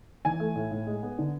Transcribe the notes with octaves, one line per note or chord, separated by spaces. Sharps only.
E3 G#5
A3
A2
A2
G#3
B3
D3